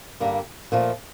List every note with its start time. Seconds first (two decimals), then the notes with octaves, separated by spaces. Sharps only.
0.20 G2 D3 G3 A#3
0.72 A#2 F3 A3